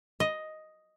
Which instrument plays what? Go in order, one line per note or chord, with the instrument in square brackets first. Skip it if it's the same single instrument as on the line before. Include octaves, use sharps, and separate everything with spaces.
[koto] D#5